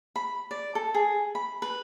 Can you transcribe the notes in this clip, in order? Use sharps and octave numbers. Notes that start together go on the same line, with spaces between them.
B5
D5
A4
G#4
B5
B4